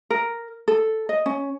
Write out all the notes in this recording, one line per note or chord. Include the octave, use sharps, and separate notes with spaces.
A#4
A4
D#5
C#4